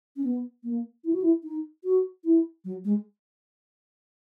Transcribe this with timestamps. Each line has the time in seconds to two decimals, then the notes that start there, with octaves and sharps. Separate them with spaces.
0.16 C#4
0.24 B3
0.63 A#3
1.04 E4
1.13 F#4
1.22 E4
1.43 D#4
1.84 F#4
2.24 E4
2.65 F#3
2.85 G#3